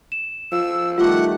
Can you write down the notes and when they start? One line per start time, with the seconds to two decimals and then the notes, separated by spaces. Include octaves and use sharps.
0.12 E7
0.52 F3 E6
0.98 D#3 G3 A3 F4 F#5 D6